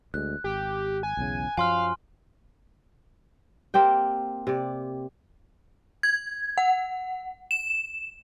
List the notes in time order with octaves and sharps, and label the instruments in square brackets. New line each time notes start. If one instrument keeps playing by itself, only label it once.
[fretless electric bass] D2 G#3 [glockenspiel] F#6
[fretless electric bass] G#1 [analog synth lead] G4
[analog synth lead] G#5
[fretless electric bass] B1 E2 C#3
[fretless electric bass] F#2 F3 F#3 [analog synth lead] F5 [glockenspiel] G#5 C6 F6
[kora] A#3 C4 G4 G5
C3 D5
[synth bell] G#6
F#5
E7